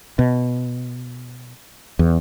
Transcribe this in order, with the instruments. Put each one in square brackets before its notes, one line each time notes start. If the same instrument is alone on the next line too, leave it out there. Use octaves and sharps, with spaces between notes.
[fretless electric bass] B2
E2